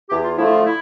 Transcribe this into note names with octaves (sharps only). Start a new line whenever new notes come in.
E2 G4
F4
D3 F3 A3 E4
F4
E4